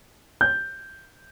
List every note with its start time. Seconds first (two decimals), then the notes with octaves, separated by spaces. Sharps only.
0.41 G6